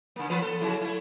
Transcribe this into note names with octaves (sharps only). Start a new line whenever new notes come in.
C#3 A#3
E3 A#3 B4
A4
F2 C#3 E4
A3 E4